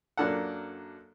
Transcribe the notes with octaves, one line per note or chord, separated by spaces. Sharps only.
F#2 A#3 D4 A4 F#5